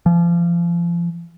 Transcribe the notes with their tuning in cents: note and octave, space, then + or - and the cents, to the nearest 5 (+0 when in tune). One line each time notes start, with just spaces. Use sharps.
F3 -30